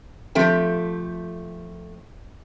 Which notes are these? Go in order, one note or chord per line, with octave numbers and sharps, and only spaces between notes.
F3 A3 C4 G4